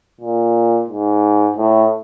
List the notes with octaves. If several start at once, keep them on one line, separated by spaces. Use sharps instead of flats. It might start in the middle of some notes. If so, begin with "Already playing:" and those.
A#2
G#2
A2